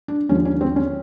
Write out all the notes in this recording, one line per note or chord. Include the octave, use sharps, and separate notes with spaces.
D4
D#2 D3 F3 C#4
C#4
C4
C#4